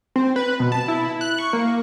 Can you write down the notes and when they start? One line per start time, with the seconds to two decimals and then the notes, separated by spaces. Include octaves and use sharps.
0.16 C4
0.36 B4
0.60 B2
0.72 A5
0.88 E4
1.21 F#6
1.39 C#6
1.53 A#3